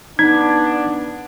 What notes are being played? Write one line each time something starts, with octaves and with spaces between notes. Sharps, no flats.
B3 D4 D#4 G#6